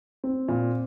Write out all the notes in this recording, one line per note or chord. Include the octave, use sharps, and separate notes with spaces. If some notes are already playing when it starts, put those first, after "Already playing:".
C4
A#2